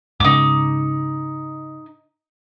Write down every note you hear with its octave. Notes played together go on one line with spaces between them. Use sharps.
G#2 C#3 D#4 D6